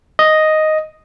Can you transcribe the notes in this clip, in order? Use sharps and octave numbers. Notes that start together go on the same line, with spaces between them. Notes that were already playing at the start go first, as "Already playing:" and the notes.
D#5